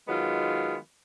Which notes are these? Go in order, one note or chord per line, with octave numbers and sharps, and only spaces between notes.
D#3 F#3 G#3 B3 F4